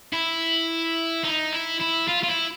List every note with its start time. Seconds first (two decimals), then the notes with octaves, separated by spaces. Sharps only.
0.13 E4
1.24 D#4
1.53 E4
1.81 E4
2.09 F4
2.23 F4
2.30 E4